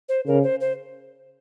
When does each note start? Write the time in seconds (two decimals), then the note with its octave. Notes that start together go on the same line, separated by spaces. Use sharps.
0.09 C5
0.26 C#3 A#4
0.43 C5
0.61 C5